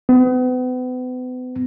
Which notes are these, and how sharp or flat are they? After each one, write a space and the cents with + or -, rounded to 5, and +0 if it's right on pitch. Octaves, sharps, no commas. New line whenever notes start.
B3 +40